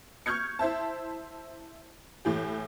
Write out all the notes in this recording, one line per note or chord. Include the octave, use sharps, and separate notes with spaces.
C#6 F6 G6 G#6 C#7
E4 C5 E5 A5
A2 E3 G4